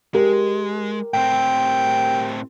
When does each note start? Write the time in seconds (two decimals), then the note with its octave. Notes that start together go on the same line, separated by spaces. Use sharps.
0.14 G#3 G4 A#4
1.14 A2 C4 G5